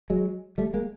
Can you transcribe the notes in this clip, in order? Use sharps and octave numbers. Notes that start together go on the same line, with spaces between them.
F#3 G#3
G3 A3
G#3 A#3